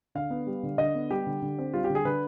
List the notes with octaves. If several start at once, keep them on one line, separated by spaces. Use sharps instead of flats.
D3 F5
B3
G3
D3
D3 D#5
B3
G3 G4
D3
D3
C4
G3 F4
G4
D3
G#4
D3 B4